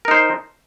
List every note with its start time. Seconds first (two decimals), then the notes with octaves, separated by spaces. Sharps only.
0.05 A#4
0.08 D#4
0.11 C5